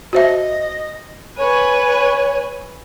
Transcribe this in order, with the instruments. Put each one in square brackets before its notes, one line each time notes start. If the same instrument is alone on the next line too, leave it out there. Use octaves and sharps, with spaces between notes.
[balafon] F#4 C5 E5 [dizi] D#5
[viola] B4 G#5 [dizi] C#5